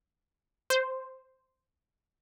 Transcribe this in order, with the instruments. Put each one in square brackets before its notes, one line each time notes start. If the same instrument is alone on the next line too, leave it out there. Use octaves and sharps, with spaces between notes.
[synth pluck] C5